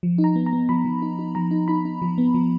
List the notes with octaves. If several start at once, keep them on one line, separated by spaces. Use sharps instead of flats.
F3
D#4
A#5
B3
A#5
B3
F3 B5
F3
D#4
D#4
F3 A#5
D#4
D#4 B5
D#4
F3
B3
F3